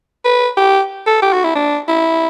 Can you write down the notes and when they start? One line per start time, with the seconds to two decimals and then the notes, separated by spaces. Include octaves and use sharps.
0.25 B4
0.57 G4
1.06 A4
1.22 G4
1.33 F#4
1.44 E4
1.55 D4
1.88 E4